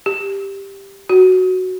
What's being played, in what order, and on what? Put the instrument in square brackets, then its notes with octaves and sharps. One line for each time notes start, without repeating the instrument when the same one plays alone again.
[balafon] G4
F#4